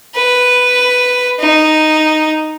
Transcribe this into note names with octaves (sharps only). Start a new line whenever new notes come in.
B4
D#4